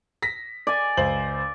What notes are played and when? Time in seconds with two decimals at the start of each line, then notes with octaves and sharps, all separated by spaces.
0.22 A#6 B6
0.67 D5 G#5
0.97 C#2 C5 F#7